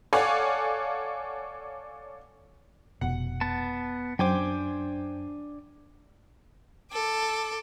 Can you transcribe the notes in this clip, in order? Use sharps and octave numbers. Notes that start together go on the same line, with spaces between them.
A4 C#5 D5 F5 F#5 G#5
F1 B2 F#5
B3 A5
F#2 D4 C5 G5 G#5 D6
A4 D6